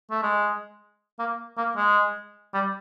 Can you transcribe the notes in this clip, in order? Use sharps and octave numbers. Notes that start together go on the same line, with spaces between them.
A3
G#3
A#3
A#3
G#3
G3